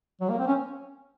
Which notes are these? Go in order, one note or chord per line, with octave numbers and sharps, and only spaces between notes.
F#3
A#3
C4
C#4